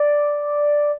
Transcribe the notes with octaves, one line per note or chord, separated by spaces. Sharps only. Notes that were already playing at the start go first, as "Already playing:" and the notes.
Already playing: D5